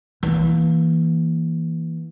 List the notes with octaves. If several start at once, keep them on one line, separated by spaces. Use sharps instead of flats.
E3 A#3